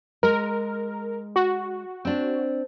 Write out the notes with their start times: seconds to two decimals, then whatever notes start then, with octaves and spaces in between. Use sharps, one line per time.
0.23 G#3 A#4
1.36 F#4
2.05 C4 D4